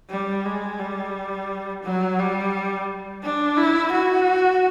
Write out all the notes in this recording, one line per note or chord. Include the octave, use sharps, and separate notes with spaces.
G3
G#3
G3
F#3
G3
D4
E4
F#4